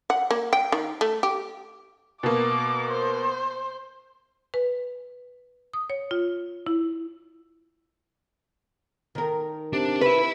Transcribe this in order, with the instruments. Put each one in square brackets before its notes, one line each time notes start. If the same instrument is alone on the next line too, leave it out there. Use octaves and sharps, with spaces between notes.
[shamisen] F#5
A#3
G5
D#3
A3
G4
[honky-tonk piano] B2 A#3 [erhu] D6
[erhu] C5
[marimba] B4
D#6
C#5
F4
E4
[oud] D#3 A#4
[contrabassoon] C3 [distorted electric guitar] D4
[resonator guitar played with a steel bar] B4 [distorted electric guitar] E5 B5